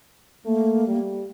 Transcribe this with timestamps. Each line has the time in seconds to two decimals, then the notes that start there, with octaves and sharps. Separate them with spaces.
0.45 A3 A#3
0.87 G3